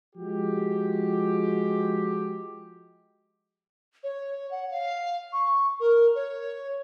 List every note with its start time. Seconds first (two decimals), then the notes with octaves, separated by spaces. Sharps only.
0.16 F3 G#3 F#4 G4
4.03 C#5
4.51 F#5
4.71 F5
5.32 C#6
5.80 A#4
6.15 C#5